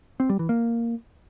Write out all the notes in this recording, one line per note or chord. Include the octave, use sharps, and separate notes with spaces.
C4
G3
E3
A#3